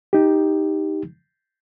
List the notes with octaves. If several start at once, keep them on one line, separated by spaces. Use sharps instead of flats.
D#4 G4